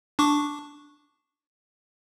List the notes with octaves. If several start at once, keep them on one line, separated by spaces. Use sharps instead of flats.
D4 C#6 D6